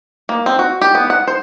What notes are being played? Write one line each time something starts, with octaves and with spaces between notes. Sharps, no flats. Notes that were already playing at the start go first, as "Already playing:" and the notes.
A#3
C4
F#4
G4
B3
F#5
C5